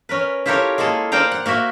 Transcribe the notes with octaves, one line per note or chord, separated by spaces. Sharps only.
C#4 A#4 B4
E4 F4 G4 A4 A#4 C#5
G#3 A#3 G#4 A4
A#4 C5 D5 F5 G5 A#5
F#5
A#3 F#4 A#4 E5